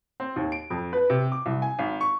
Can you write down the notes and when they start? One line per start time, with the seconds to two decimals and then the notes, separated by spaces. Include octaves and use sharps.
0.20 C4
0.36 D#2
0.52 D7
0.70 F2
0.93 B4
1.10 C3
1.32 D6
1.46 C2
1.62 G#5
1.79 G#1
2.01 C#6